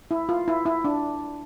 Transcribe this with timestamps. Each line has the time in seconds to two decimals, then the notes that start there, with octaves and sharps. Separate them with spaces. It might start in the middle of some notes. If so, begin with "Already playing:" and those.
0.11 E4
0.29 F4
0.48 E4
0.66 E4
0.84 D4